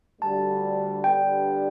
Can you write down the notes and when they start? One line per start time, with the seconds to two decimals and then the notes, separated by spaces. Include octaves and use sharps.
0.21 D2 D3 G3 A5
1.04 D3 G3 B3 D4 G4 G5